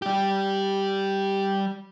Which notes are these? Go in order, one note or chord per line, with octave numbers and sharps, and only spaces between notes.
G3 G4